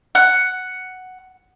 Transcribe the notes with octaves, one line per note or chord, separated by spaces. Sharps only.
F#5